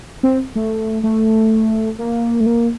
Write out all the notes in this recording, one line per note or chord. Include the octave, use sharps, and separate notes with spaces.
C4
A3
A3
A#3
A3
A#3